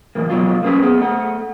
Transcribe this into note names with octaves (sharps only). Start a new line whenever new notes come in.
E2 A2 A#3
F2 B2 F#3 F4
A3 A#3 C4 C#4 B4
B3 G#4
A3 F#5